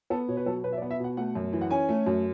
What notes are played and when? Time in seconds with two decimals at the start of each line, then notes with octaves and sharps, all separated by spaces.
0.10 B3 A4
0.28 B2 C#5
0.37 B4
0.46 F#3 A4
0.64 B2 B4
0.73 E5
0.77 D5
0.82 B3
0.91 E5
1.00 B2 F#5
1.17 A3 F#5
1.35 F#2
1.53 E3
1.61 F#5
1.71 C#4 G#5
1.89 A3
2.07 F#2